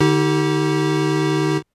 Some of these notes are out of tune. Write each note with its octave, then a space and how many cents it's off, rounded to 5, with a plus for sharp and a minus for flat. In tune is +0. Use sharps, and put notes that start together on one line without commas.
D3 +30 D#4 +35 G4 -20